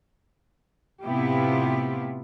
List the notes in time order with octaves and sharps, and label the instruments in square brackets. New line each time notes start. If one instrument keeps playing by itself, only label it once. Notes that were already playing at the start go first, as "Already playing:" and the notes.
[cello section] A2 C3 B3 E4 F4 G4